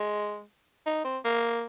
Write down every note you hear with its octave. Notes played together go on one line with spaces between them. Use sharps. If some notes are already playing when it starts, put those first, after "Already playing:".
Already playing: G#3
D#4
C4
A#3